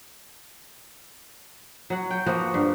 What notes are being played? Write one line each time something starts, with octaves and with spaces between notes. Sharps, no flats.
F#3 F#5
G5
F3 A#3 B3 F#4
G2